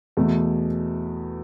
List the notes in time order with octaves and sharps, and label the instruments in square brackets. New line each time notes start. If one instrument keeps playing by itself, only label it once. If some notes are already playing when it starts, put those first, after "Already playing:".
[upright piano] E2 B2 A3